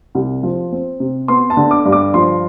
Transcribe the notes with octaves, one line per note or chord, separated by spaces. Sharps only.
C2
F3
C4
C3
B3 C6
A5
D3
D6
G2
D6
F3 C6